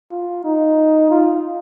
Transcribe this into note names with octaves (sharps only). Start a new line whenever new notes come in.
F4
D#4
F4